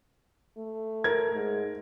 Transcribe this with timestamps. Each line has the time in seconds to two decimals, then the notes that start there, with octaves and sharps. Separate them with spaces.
0.57 A3
1.04 A#4 G#6
1.34 G#2